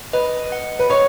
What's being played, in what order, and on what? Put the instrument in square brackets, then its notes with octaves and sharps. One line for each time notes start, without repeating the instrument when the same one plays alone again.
[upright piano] B4 [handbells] D#5
[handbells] F#5
[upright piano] B4
[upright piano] C#5 [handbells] D#5